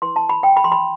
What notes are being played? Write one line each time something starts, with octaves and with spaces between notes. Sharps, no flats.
E4 B4 C6
A5
B5
G5
B5
C6
B5